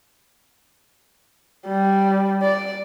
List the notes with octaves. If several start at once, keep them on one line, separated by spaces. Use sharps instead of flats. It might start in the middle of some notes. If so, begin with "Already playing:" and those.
G3
D5